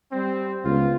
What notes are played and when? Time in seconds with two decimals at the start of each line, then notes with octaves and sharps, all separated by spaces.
0.12 G3 C4
0.65 C#2 B3 F4